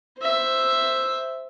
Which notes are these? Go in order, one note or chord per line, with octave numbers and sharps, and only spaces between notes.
C5 E5